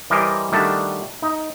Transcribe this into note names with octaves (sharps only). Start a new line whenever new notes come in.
E3 G3 A#4 C5 D#5 G5
D#3 G3 A3 D4 F#4 A5
D#4